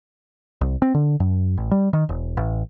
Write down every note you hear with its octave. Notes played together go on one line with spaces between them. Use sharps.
C2
C4
D3
F#2
A1
G3
D#3
E1
A1